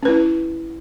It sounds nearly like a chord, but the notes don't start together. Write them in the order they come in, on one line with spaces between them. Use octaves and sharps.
C#4 B4 E4